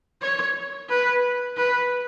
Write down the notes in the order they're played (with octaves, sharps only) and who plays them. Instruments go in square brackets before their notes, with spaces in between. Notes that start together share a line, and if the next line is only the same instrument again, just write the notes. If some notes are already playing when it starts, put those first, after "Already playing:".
[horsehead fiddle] C#5
B4
B4